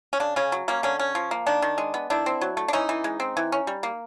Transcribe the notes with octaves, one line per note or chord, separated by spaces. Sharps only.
C#4
C#3 D4
C#3 C#4
F#3
A#3 C#4
D3 C#4
C#4
F3
A#3
D#3 D4
D#3
G#3
B3
D#3 D4 E4
C4
F#3
A3
D4
E3 C#4 D#4
E3
G#3
C4
E3
C#4
G3
A#3